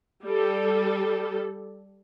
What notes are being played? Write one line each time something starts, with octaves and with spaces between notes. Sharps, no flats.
G3 A4